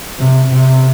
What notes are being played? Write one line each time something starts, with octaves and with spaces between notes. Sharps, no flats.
C3
C3